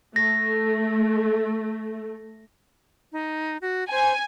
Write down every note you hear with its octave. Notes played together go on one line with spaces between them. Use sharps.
A3 A#6
D#4
F#4
C5 G#5